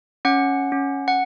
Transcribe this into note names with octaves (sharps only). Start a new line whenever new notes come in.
C#4 F#5
C#4
F#5